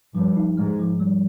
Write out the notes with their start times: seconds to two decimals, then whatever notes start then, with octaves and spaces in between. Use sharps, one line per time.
0.15 G2 F3
0.36 D#4
0.57 G#2 G#3
0.79 F3
1.00 G3